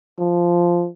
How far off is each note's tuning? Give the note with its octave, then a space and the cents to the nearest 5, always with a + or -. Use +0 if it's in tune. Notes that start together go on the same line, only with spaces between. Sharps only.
F3 -5